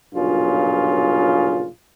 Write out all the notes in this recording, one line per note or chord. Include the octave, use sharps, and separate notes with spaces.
B1 G2 A#2 C#3 F4